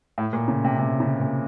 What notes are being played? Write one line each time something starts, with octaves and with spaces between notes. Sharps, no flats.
A2
A#2
C#3
C3
C3
C#3
A#2